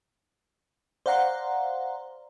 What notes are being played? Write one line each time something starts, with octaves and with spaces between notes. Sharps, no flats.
C5 D5 F5 F#5 A#5 C6